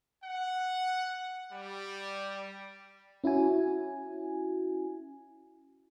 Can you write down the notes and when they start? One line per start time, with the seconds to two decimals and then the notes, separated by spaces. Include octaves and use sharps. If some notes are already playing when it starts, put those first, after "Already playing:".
0.24 F#5
1.53 G3
3.24 C#4 E4 F#4 G#5